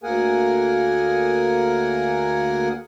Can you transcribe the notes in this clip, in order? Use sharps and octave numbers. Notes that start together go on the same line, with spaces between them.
D2 A#3 G#4 A#4 F#5 G#5